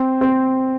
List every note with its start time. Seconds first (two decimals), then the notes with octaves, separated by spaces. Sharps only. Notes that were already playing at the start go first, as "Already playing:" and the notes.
Already playing: C4
0.21 C4